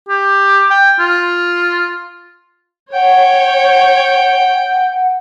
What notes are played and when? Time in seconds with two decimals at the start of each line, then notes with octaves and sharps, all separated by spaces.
0.09 G4
0.70 G5
0.99 F4
2.93 C#5 F#5 G5